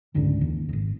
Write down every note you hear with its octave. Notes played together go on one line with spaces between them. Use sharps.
F1 C#2 G#2 D3
D#2
D#1 G#1